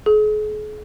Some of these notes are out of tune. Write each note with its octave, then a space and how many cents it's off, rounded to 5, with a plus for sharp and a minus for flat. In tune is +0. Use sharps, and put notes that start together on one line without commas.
G#4 +40